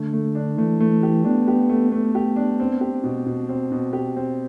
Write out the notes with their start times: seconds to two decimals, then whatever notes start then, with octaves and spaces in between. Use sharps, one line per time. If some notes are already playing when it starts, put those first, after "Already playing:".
Already playing: D3 A3
0.13 A3
0.35 D4
0.57 E3 A3
0.80 A3
1.03 G4
1.25 B3 D4
1.48 G4
1.69 A3
1.92 A3 B3
2.15 G4
2.36 D4
2.60 C4
2.81 G4
3.04 B2
3.26 B2
3.49 C4
3.72 B2
3.93 G4
4.16 C4